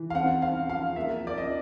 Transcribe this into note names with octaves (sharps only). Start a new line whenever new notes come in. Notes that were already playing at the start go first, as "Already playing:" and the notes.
Already playing: E3
F5
C4 F#5
C4 F5
F3 F5
A#3 E5
F3 D5
D#5